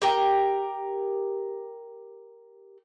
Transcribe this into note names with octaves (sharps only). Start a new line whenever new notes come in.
G4 A#4 G5